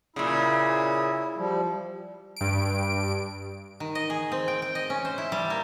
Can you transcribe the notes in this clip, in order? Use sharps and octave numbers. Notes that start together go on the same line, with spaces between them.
A#2 C#3 E4
F3 G3
G2 D7
D#3
D#5
G#4
C4
G5
G5
D#5
C#4
C5
E4
G3
A#3